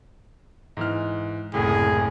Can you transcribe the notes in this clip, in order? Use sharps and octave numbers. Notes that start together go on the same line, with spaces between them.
G#2 E3 F6
F#1 C2 A2 G#4